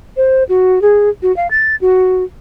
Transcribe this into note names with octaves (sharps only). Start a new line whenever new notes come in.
C5
F#4
G#4
F#4
F5
A6
F#4